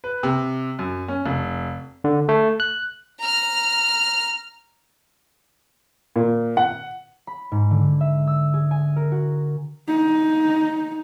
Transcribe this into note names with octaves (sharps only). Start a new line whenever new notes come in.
B4
C3
F#2
C#4
F1
D3
A3
F#6
A#5 F6
A#2
F#5
B5
G#2
D3
E5
E6
G#4
G#5
A#4
F#4
D#4